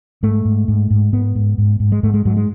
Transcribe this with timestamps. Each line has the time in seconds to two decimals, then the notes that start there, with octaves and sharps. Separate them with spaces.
0.23 G#2 A3
0.45 G#2
0.68 G#2
0.90 G#2
1.13 G#2 B3
1.35 G#2
1.58 G#2
1.80 G#2
1.92 G#3
2.03 G#2 A3
2.14 G#3
2.25 G#2 F#3
2.37 G#3